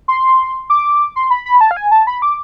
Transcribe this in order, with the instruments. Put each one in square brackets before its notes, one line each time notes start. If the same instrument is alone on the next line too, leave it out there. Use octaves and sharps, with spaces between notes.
[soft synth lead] C6
D6
C6
B5
B5
A5
F5
G#5
A5
B5
D6